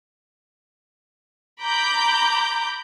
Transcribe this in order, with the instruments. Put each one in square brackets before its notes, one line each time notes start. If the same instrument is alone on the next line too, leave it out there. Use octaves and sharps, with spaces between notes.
[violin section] A#5 B5 D6 G6